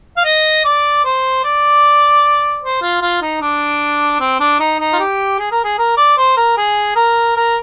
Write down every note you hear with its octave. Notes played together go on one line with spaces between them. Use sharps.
F5
D#5
D5
C5
D5
C5
F4
F4
D#4
D4
C4
D4
D#4
D#4
F4
G4
G#4
A#4
G#4
A#4
D5
C5
A#4
G#4
A#4
A#4